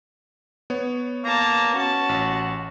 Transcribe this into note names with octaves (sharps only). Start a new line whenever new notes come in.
B3 C#5
A#3 A5 A#5
C#4 F#4 A5
A1